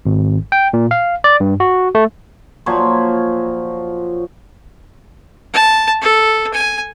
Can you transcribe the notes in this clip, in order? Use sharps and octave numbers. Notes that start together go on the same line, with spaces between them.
G#1
G5
A#2
F5
D5
G2
F#4
A3
A#2 F3 F#3 C#5
A5
A4
G#5